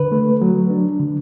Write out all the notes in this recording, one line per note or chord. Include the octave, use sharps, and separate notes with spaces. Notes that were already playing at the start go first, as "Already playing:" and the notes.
Already playing: D3 B4
A3
F#3
D4
D3